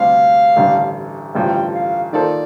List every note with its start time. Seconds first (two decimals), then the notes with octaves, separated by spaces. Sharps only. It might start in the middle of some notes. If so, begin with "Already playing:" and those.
Already playing: D2 C3 G3 D4 G4 F5
0.56 A1 G2 D3
1.35 A1 G2 D3 F3 G5
1.74 F5
2.13 D#3 A#3 F4 A4 C5 D5